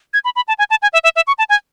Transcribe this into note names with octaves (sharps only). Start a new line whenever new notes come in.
G#6
B5
B5
A5
G#5
A5
G#5
E5
E5
E5
C#6
A5
G#5